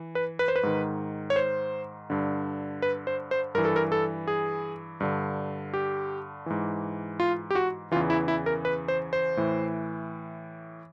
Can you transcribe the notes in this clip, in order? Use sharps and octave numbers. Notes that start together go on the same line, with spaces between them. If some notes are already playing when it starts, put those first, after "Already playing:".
Already playing: E3
B4
B4
C5
B4
G#2 D#3
C#5
C5
G2 D3
B4
C5
C5
G2 E3 A#4
A4
A#4
A4
G#4
G2 D3
G4
G#2 E3
F4
G4
F#4
E2 C#3 E3 F4
E4
E4
A#4
B4
C5
C5
A2 E3